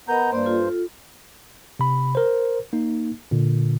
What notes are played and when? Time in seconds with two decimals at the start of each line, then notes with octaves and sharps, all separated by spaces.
0.08 B3 A#4 D#5 A#5 B5 G6
0.32 G2 A#3 C5 D5
0.44 F4 A4
1.79 C3 B5
2.15 A#4 C5
2.73 A#3 D#4
3.31 A#2 D3